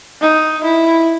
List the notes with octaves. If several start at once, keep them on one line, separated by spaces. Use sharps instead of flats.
D#4
E4